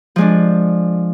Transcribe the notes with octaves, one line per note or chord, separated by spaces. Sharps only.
F3 G#3 D4